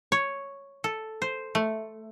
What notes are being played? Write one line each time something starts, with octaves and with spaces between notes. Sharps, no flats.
C#5
A4
C5
A3